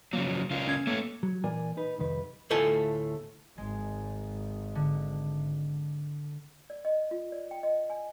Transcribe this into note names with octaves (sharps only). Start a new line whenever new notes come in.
C#3 F3 F#3 A#3
C#3 A#3 F4
C#4 G#6
A3 A#3 C#4
F#3
A#2 E3 A#4 D5 G#5
D#4 B4
C2 F2 D#3 B4
D2 A2 A3 F4 A4 G#5
G#1 G#3
D3
D5
D#5
F4
D5
G5
D#5
G#5